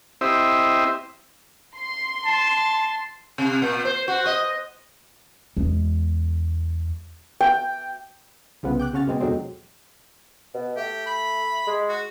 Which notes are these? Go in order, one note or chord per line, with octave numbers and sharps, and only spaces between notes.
C4 E4 G4 C5 D#5 E5
C6
A5
C3
A#2
C5
F#4
D#5
E2 G#3
G5
C2 C#3 F3 B3
G5 D6 F#6
C#3 C#4 F#4 F6 A6
B2 G#3 C4
E2 B2 D3 F#3 G#3 C4
B2
A3 G4
B5
G#3
F#4